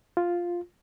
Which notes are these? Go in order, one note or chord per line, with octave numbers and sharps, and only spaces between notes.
F4